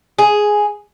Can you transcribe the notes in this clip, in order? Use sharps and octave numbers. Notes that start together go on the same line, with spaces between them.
G#4